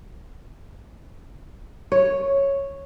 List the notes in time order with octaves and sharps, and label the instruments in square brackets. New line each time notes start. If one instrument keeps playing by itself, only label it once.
[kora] C#5